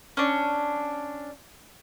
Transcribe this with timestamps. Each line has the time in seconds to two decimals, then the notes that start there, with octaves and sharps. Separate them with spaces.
0.17 C#4 D4